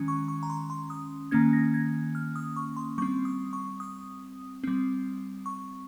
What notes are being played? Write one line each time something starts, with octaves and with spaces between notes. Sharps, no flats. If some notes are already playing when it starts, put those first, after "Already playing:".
Already playing: D#3 G#3 C#4
C#6
C#6
A#5
C6
C6
D#6
D#3 A#3 C#4 G#6
A#6
G#6
F6
D#6
C#6
C6
G3 C4 C#6
D#6
C#6
D#6
G3 C4
C#6